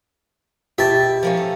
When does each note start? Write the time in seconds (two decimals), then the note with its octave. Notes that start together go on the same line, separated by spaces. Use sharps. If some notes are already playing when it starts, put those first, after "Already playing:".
0.78 B2 G4 E5 A5
1.23 F3 A#3 C#4
1.37 A4